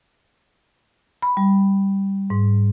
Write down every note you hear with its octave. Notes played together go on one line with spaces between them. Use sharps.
B5
G3
G#2